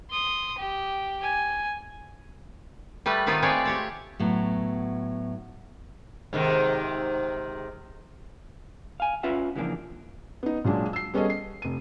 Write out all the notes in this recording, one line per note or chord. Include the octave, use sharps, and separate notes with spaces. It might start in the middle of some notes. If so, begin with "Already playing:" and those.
C6 D#6
G4
G#5
G3 A3 B4 A5
D#3 A3 B3 C4 D#4 F4
G#3 A3 C4 B4 C#5 D5
G4 C#5 A5
A2 F#3 B3
G#2 C3 D#3
F5 G#5
C#4 F4 B4 E5 F#5
C#3 E3 F3 A#3 D4
B3 D#4
A#2 F#3 G#3 D4
E6 C7
G3 B3 C#4 G#4 A4 D#5
C7
F1 D#7